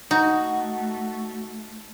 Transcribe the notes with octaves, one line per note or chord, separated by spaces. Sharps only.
A3 D#4 F#4